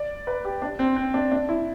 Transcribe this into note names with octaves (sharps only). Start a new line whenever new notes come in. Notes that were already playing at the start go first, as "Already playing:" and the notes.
Already playing: D5
B4
G4
D4
C4
C4
D4
D4
E4